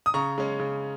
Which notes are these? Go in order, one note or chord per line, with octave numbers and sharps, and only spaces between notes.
D#6
C#3 A#5 C#6
G#3 C#4
C#3